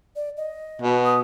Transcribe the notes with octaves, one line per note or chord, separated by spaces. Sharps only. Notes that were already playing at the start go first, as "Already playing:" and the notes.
D5
D#5
B2
D#6